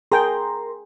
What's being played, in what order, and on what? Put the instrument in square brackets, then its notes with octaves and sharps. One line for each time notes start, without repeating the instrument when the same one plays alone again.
[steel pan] G#4 G5 [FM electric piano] A#4 A#5 C6